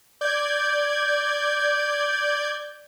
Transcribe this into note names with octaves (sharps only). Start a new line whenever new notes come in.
D5 G6 G#6